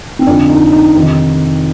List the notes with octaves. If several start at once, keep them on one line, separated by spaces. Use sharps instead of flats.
C4
F2 D3 D4
D#4
D#4
F2 C3 D#3